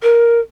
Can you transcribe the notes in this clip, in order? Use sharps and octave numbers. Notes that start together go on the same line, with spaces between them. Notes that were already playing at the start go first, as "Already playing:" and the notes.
A#4